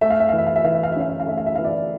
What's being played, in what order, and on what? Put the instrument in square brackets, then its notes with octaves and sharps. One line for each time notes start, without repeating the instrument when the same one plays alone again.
[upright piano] A3 E5
F5
E5
E3 F5
E5
F5
E5
E3 F5
E5
F5
C#4 E5
F5
E5
F5
A3 E5
F5
E5
E3 F5
D5 E5